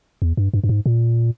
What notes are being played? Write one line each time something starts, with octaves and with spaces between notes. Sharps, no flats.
E2
G2
G2
G2
G#2
A#2